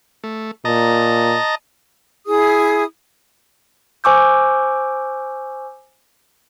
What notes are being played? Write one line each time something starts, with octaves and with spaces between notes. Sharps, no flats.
A3
A#2 D#5 A5 A#5
E4 G#4 D#6
C5 G#5 C#6 D6 E6 G6